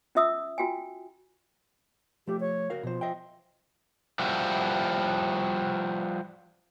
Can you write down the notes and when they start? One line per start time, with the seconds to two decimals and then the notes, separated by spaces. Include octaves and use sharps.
0.15 C#4 F4 E5 D#6 E6
0.58 F4 F#4 G5 G#5
2.27 F3 A3 G4
2.40 C#5
2.70 F#4 A#4 F5
2.83 B2 F3 C5
3.01 D#5 E5 G5
4.19 F3 G3 E4 F#4